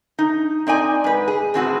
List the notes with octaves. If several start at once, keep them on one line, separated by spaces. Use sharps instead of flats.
D#4
C4 D#4 D5 G#5
G#2 B4
G#4
A2 C4 F#4 G#4